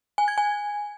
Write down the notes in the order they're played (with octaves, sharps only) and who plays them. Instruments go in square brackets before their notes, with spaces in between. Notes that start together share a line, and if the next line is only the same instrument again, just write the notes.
[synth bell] G#5
G#6
G#5